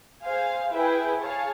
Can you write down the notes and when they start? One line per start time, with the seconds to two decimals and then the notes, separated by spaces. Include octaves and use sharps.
0.22 G#4 C5 F5 G#5
0.71 E4 G#4 B4 E5 G5
1.21 G#4 C#5 F5 A5